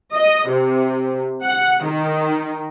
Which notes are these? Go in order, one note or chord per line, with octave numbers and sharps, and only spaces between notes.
D#5
C3
F#5
D#3